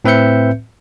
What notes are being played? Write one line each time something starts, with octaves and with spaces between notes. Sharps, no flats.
A2 C4 B4 E5 G6 C#7